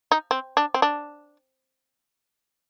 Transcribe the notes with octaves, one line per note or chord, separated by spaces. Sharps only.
D#4
C4
D4
C4
D4